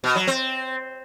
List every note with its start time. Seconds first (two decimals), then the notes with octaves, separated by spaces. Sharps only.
0.04 B2
0.16 F#3
0.27 C4